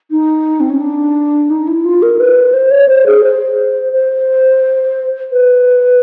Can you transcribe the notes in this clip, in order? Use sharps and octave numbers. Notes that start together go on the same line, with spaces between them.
D#4
C4
C#4
D4
D#4
E4
F4
A#4
B4
C5
C#5
C5
G#4
C5
C5
B4